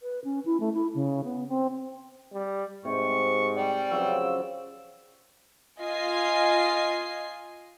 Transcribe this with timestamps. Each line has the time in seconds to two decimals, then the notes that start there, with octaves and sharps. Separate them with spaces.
0.01 B4
0.24 C#4
0.45 E4
0.60 A3
0.74 E4
0.94 C#3
1.24 B3
1.48 C4
2.33 G3
2.85 G#2 C3 C#6
3.57 D5 G5
3.91 C#3 F3 F#3 E6
5.80 F4 D#5 G#5 C7